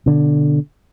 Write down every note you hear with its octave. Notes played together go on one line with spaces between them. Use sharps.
B2 D3